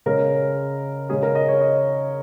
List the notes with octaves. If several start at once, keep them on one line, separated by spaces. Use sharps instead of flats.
C#3 G#3 C#4 A#4
C#3 G#3 C#4 G#4
A#4
D#5
C#5
D#5